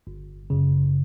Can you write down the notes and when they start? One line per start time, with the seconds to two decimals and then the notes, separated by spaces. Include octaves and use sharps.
0.07 G1
0.50 F#2 C#3